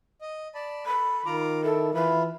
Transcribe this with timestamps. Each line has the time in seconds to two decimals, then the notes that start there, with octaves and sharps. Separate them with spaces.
0.21 D#5
0.55 D5 A5 B5
0.86 A4 B5
1.26 D#3 F4 A#5 D6
1.64 E4 A4
1.94 E3 E4 F4 B5